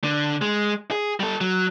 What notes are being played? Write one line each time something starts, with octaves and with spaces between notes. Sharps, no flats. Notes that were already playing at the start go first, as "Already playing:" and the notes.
D3
G#3
G#4
G3 A4
F#3